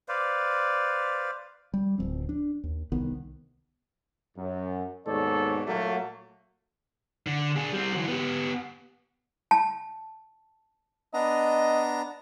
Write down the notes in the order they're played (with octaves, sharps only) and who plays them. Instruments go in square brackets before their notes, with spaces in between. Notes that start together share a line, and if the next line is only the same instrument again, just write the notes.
[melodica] B4 C5 D5 F5
[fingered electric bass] G3
D1 F3 C4
D4
D#2
C2 D#3 B3
[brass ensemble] F#2
D#2 G#2 B2 A4 C#5 D5
A#2 F#3 A3 A#3 F#4
[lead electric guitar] D3
D4 G#4
G3 C4
E3 F#3
B3 G4
[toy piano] A5
[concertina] B3 D4 A#5 [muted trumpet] D#5